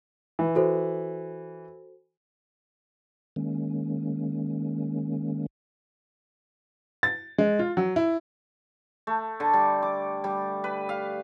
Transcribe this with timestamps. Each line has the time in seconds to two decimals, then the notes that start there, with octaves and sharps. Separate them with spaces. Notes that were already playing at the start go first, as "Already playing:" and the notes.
0.39 E3
0.55 F#4 A4 C5
3.36 D#3 G#3 A#3 C#4
7.03 A6
7.38 G#3
7.59 F4
7.77 F#3
7.96 E4
9.07 A3
9.40 D3
9.54 G3
9.83 D6
10.24 G3
10.64 B4
10.89 F5